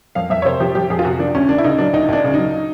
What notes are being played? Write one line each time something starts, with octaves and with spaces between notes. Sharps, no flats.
F2 F5
F2 E5
C#5
C3 C5
F3 G4
F2 G4
F2 G#4
F4
C3 F#4
F3 D4
D2 C#4
D2 D4
E4
C#3 D#4
F#3 D4
D2 D#4
D2 D4
C#3
F#3 D#4